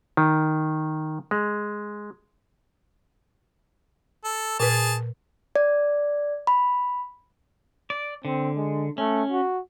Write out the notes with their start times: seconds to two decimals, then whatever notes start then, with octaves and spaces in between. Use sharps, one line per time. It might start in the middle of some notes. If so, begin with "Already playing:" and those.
0.17 D#3
1.31 G#3
4.24 A4
4.60 A#2 G#4 B4 A5
5.56 D5
6.47 B5
7.90 D5
8.25 D3 C4
8.56 G#3
8.98 A3 C#4
9.32 F#4